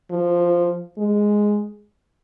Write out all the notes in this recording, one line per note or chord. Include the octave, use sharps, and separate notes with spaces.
F3
G#3